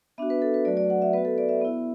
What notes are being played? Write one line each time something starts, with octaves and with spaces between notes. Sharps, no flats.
B3 D4 F#4 E5
B4
A4
B4
F#3 A3 F#4 D5
D5
F#5
E5
B3 F#4 B4
A4
D5
E5
B3 E4